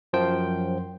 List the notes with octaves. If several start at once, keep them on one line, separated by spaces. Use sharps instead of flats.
F#2 F3 C5 G5